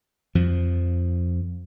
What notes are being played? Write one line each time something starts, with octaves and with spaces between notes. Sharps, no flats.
F2 F3